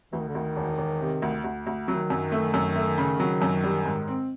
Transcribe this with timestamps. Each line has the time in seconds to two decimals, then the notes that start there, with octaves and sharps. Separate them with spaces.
0.13 D2 E3
0.20 D#3
0.28 D3
0.35 D2 D#3
0.56 E1
0.78 E1
1.01 C3
1.22 D2
1.44 D2
1.67 D2
1.88 D#3 F#3
2.10 F#2
2.32 A3
2.54 F#2
2.76 A3
2.98 C#3
3.20 F#3
3.42 F#2
3.64 G3
3.85 G#2
4.08 C4